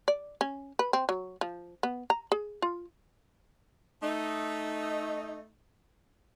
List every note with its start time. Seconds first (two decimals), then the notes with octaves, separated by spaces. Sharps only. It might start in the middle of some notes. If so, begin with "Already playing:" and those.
0.08 D5
0.41 C#4
0.79 B4
0.93 C4
1.09 F#3
1.41 F3
1.83 B3
2.10 A#5
2.32 G#4
2.62 F4
4.02 A3 D#4